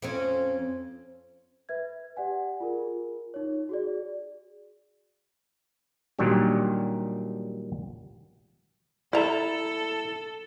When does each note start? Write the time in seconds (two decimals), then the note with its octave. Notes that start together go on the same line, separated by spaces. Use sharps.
0.02 F2 C4 C#4
1.69 B4 E5 G#6
2.17 G4 D5 F#5 G#5
2.60 F4 G#4 A#4
3.34 D#4 C#5
3.69 F#4 G#4 D5
6.19 A#2 D#3 F#3 G3 D4 G4
9.13 E4 A4 D5 A#5